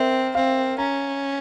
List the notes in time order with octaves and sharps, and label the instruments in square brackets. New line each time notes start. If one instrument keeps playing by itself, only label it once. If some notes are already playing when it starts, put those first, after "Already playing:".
Already playing: [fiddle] C4 [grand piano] A#4 E5
[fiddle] C4 [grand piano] F5
[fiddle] C#4 [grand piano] A#5